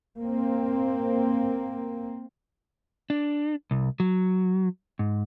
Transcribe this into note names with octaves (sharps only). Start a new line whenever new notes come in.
A#3 C4
D4
C2
F#3
G#2